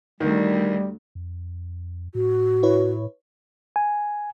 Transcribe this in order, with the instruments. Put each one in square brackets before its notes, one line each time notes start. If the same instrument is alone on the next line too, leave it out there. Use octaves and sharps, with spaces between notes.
[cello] D2 [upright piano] D#3 [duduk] G3
[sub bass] F2
[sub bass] A2 [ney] F#4
[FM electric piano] E4 B4 C#5
[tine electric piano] G#5